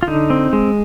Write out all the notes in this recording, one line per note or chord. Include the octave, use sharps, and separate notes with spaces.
F4
D3 D#4
C4
G#3